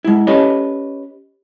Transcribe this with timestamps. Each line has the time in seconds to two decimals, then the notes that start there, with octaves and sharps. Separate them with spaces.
0.04 G#3 E4
0.27 C#4 G4 A4 B4 C#5 D#5